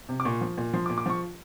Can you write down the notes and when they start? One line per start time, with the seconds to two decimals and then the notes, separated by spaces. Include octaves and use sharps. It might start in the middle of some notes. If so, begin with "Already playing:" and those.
0.09 C3
0.20 D6
0.25 A#2 C#6
0.41 F3
0.58 A#2
0.73 F3 C6
0.86 D6
0.89 A#2
0.98 D6
1.06 F3 C#6